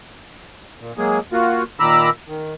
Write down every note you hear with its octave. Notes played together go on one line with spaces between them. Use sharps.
A#2
F#3 G#3 A#3 G#4
A#3 F4 F#4
A#2 D#3 A#5 B5 D6 E6
D#3